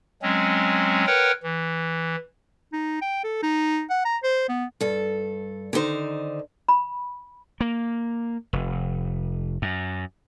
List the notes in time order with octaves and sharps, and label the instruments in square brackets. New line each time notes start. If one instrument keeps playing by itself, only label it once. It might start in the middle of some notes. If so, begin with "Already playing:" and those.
[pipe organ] F#3 G#3 C4 C#4
A#4 B4 C#5 F#5 G5
E3
[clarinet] D#4
G5
A4
D#4
F#5
A#5
C5
B3
[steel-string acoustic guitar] G2 A4
D3 D#3 D#4 C5
[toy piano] B5
[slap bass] A#3
F1
F#2